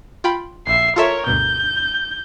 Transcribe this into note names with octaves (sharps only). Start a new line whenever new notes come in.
F4 G5 B5
A#1 E5 C7
F4 A4 A#4 C#5 E5
D2 G2 B2 G6